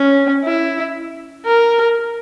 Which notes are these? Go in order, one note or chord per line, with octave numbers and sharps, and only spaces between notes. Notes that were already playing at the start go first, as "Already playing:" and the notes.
Already playing: C#4
E4
A#4